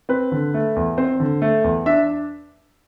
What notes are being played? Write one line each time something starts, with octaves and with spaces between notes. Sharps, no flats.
C4 B4
D3
A3
E2
C4 C5
D3
A3
E2
D4 E5